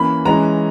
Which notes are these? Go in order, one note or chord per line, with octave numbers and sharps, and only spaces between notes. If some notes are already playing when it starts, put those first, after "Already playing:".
Already playing: E3 A#3 C#4 B5
E3 G#3 C#4 A#5